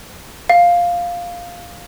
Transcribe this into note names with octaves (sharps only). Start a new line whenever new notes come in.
F5